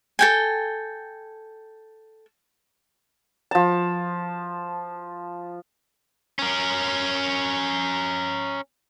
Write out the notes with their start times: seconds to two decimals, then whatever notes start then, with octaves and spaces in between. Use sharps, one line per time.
0.19 A4 G5 G#5
3.51 F3 A5
6.39 C#4 A#4